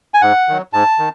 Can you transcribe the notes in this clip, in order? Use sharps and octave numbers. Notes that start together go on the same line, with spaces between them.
G#5
G#2 F#5
D#3 F#3
G#2 A5
D#3